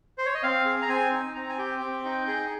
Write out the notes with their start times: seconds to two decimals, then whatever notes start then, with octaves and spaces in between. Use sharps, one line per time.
0.18 C5
0.26 C#5
0.34 D#5
0.43 C4 F5
0.65 G#4
0.82 A#5
0.88 C4 G#5
1.12 D#4
1.35 C4 A#5
1.49 G#5
1.58 G4 G5
1.82 C4
2.05 D#4
2.27 G#4